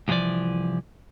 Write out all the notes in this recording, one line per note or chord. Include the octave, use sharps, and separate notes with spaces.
C2 A2 E3 F3 D5